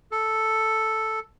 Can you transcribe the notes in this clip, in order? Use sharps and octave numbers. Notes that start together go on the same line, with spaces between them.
A4